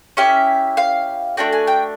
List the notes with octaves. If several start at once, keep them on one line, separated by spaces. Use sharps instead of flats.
C#4 E4 G4 E5
F5
A3 D4 F#4 G5
G#5
G5